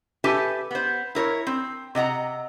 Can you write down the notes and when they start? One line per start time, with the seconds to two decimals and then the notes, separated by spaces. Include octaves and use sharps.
0.24 G4 A4 B4 E5 G#5 A5
0.71 B3 C5
1.15 E4 A#4 C#5
1.47 C4
1.95 C3 D#5 F#5 A#5